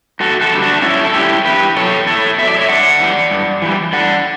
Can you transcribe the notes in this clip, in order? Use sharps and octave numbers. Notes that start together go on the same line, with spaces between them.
G2 F#4 A4
F#4 A4
D3 G3
D4 F#4
G2 C#4 E4
A4
D3 G3 E4 G4
E2 G4 B4
B2 F#3 A4 C#5
E2 A4 C#5
B2 F#3 E5
D5
C#5 E5
G2 D5 F#5
E3 G3
G2
E3 G3
A2 D5 F#5